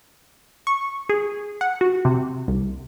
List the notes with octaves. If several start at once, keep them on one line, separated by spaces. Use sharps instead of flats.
C#6
G#4
F#5
F#4
C3
C2